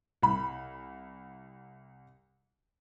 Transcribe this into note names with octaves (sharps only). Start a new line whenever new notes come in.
C2 B5